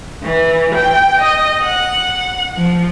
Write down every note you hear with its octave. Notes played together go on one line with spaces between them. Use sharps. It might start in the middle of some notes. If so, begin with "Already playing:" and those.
E3
G5
D#5
F#5
F3